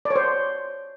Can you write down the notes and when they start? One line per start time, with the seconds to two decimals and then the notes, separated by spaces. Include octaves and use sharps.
0.05 D5
0.11 C#5
0.16 C5